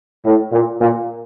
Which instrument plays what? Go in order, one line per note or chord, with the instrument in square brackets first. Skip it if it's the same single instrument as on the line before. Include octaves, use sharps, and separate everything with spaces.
[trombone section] A2
A#2
A#2